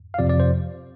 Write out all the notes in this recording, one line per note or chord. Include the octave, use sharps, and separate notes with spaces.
F5
F2 C3 F3 D5
D5
C5